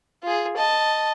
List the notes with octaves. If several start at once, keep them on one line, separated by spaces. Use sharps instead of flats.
F4 G#4
D#5 A5